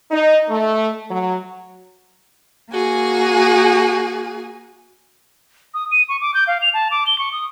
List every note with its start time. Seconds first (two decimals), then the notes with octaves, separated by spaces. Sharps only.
0.11 D#4
0.49 A3
1.09 F#3
2.72 A#3 F#4 G#4 G#5
5.74 D#6
5.92 D#7
6.09 C#6
6.21 D6
6.34 G6
6.47 F5
6.62 F7
6.74 A5
6.91 D6
7.07 G7
7.19 C#6
7.32 D#6